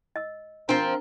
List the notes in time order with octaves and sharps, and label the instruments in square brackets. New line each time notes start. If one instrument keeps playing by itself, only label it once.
[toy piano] D#5 E6
[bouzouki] F3 C4 [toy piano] D4 [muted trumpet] A#4